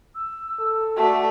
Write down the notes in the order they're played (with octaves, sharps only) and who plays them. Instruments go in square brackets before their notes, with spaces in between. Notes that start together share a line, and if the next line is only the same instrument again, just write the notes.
[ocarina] E6
[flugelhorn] A4
[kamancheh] A3 D5 [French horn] F#4 [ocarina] A5